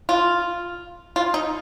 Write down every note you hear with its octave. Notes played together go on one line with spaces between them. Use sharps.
F4
F4
D#4